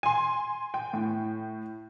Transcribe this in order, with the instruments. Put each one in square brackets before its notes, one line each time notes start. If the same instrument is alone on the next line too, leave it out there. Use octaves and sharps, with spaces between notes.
[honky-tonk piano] G#5 C6
G5
A2